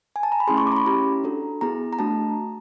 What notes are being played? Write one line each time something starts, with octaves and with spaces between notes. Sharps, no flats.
G#5
A5
A#5
B5
A3 C#4 E4 G#4 C6
C#6
D6
A#5
B5
C#4 E4 G4 A#5
D4 F#4 A4
B3 E4 G#4 A#5
A#5
A3 D4 F#4 A5